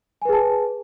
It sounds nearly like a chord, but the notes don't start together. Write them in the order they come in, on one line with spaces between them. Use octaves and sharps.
G#5 B4 G#4 A5